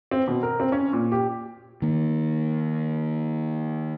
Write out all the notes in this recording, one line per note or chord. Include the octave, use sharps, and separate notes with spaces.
C4
B2
A#4
C4
C#4
A#2
G4
D#3 A#3